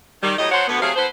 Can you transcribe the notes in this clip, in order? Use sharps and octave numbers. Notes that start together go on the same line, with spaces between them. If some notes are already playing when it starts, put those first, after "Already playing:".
D#3 G3
A2 F#3 G3 D#5
F#3 D4 F#4 C5 C#5 F#5
D2 B3
C3 F#3 A3 G#4 F5
B3 E4 A4 B4 C5